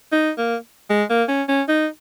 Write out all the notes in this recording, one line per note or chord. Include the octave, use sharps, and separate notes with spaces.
D#4
A#3
G#3
A#3
C#4
C#4
D#4